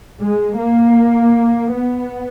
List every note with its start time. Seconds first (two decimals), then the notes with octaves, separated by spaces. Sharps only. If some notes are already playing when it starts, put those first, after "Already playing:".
0.20 G#3
0.57 A#3
1.72 B3